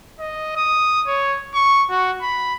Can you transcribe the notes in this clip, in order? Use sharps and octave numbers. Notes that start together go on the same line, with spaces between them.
D#5
D#6
C#5
C#6
F#4
B5